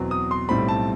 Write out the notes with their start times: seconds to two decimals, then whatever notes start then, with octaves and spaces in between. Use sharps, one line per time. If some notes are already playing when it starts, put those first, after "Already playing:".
Already playing: E2 B2 F#3 C4
0.11 D#6
0.31 C6
0.49 B1 A2 G3 C4 B5
0.68 A5